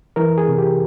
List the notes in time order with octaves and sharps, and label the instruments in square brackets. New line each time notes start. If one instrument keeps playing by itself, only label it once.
[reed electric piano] E3 A#4
G#4
C3
G4